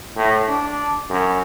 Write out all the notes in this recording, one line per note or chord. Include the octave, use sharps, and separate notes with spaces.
A2
D4
F#2